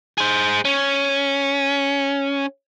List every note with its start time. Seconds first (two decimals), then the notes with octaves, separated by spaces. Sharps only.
0.18 G#4 C5
0.65 C#4